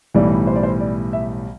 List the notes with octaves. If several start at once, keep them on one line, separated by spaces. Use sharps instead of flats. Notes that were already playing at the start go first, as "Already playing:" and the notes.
B1 A2 E3 G3 D5
C5
D5
C5
D5
E5